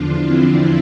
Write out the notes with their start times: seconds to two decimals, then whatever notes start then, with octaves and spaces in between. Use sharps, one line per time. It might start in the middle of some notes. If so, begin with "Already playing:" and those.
Already playing: E2 D3 F3 D4 F4
0.23 C4 E4